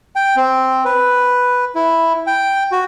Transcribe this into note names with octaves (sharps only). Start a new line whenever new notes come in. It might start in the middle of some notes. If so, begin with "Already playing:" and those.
G5
C4
B4
E4
G5
F#4